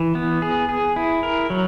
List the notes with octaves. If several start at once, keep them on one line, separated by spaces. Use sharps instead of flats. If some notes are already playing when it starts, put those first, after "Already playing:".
Already playing: E3
B3
G#4
G#4
E4
A#4
F#3